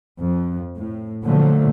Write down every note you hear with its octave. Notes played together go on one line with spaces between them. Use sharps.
F2
A2
A#2 D3 F3 F#3 A3